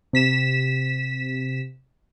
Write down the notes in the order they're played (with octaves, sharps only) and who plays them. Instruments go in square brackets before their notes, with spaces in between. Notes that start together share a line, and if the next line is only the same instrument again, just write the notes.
[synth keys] C3 B6 E7